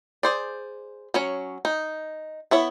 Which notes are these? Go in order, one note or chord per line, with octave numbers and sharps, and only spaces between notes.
G#4 C5 D5
F#3 C#4 C#5
D#4
B3 E4 C#5